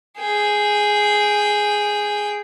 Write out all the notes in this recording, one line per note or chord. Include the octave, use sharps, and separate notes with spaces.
G#4 G5